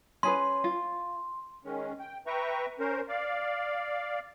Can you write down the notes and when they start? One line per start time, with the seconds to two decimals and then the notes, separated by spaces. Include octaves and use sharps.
0.23 C#4 G#4 B4 C6
0.64 F4
1.65 D#3 G#3 C#4
2.00 G5
2.27 B4 E5 G5 A#5 C#6
2.79 C#4 A#4 C5
3.09 D5 F5